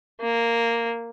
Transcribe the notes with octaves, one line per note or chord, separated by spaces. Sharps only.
A#3